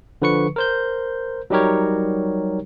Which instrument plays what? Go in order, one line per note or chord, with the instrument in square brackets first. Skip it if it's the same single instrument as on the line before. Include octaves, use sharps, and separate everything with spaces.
[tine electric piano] D3 F3 B4 C#6 C#7
A#4 C5 G6
F#3 G3 D#4 G4 A#4 C#5